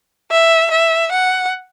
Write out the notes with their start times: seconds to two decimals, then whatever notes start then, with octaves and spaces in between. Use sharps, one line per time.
0.31 E5
0.71 E5
1.12 F#5